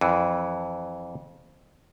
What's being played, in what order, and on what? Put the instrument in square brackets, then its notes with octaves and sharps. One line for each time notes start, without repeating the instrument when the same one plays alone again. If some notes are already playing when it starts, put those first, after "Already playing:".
[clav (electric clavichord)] F2 E3